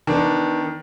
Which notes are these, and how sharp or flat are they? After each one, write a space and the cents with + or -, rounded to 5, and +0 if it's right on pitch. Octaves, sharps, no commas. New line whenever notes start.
D#3 +10 B3 +0 D4 -5